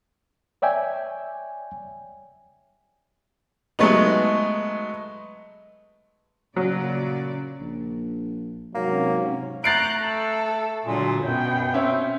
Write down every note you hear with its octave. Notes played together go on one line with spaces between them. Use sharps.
C#5 D5 E5 G5 G#5
F#3 G#3 A3 B3 D#4
A#2 C#3 F#3 D5
A#1
G#2 C3 F#3 A#3 C#4
A3 A#5 F#6 G6 A6 C7 D7
A4
A#2 D3 F#3 G#3
F#2 B2 B3 G5
C4 C#4 E5